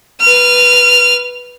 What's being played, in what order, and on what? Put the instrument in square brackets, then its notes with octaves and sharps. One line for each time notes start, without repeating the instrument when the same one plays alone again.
[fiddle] B4 F6